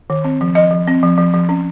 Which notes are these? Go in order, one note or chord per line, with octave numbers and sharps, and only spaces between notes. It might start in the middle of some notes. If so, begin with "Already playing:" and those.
D#3
C4
F3
F3 D#5
F3
C4
F3
F3
F3
C#4